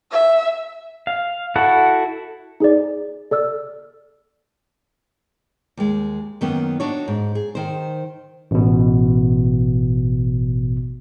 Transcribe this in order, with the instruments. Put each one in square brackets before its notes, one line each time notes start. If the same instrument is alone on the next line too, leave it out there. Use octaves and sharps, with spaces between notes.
[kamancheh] E5
[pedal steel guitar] F5
E4 F#4 A4 F#5
[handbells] D#4 G#4 C5 D5
A4 D5 E6 F6
[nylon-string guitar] D#2 G#3
F#2 D#3 A#3 B3 C#4
D4 D#4 F#4 C#5
G#2
G#4
D#3 C5
[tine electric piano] A1 B2